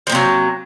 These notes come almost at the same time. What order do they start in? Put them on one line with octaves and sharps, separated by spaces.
F3 A#3 C3 F#3